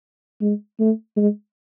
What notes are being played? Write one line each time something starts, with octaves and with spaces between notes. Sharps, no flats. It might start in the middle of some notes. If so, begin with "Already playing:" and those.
G#3
A3
G#3